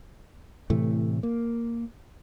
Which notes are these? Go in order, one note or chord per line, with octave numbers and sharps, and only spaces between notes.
A2 C3 E3 A3
A#3